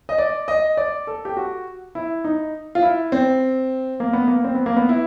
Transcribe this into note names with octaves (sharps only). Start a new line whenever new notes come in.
D#5
D5
D#5
D5
A4
G4
F#4
E4
D#4
F4
E4
C4
A#3
B3
A#3
C4
B3
A#3
B3
E4